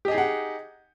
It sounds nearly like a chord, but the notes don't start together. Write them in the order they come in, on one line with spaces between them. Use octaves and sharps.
G4 D#5 G#4 D#4 F#5